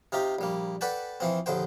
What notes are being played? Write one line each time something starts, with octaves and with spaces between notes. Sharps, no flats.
C3 D#4 F4 G4
A#1 G3 A#3
A4 B4 D5 F#5 G5 A5
E3 F3 C4
A#1 D#2 D3 C5 G5